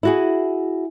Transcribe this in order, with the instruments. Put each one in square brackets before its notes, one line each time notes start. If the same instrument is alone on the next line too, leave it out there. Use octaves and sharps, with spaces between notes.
[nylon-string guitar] E4 F#4 G#4